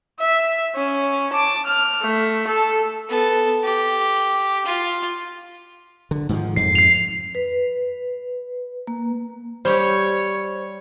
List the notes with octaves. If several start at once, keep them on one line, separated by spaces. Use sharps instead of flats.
E5
C#4
A5 D6
F6
A3
A4
B3 A4
G4
F4
D3
G#2 D#3 F3
F2 G#2 C7
C7 F7
B4
A#3
G3 G4 C5 C#5